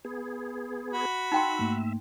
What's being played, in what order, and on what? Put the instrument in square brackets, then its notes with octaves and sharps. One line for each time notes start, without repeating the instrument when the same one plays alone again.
[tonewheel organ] B3 G#4
[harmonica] F#4 B5
[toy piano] D#4 G5 C6 [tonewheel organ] E5
[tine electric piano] G#2 A3 A#3